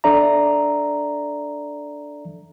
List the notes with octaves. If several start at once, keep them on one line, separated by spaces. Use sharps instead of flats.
D4 A4 D5 E5 A#5